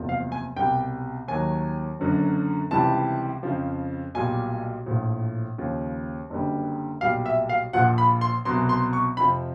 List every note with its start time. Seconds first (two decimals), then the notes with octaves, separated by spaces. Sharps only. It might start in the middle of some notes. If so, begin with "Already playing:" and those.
Already playing: F#1 E2 C3 F3
0.09 F5
0.32 G#5
0.56 C2 B2 G3 G5
1.28 D#2 D#3 F#3 G#5
1.99 F#1 F#2 D3 F#3
2.71 C#2 C3 E3 G3 A5
3.43 F2 C#3 F3
4.14 B1 A#2 G3 G#5
4.86 A#1 A2 F3
5.58 D#2 C#3 F3
6.30 F#1 F#2 D3 G3
7.01 B1 A#2 G3 F5
7.26 E5
7.49 F5
7.73 A#1 A#2 F3 F#5
7.98 B5
8.21 C6
8.45 C2 B2 F#3 C6
8.69 C6
8.93 C#6
9.17 F2 C3 F3 B5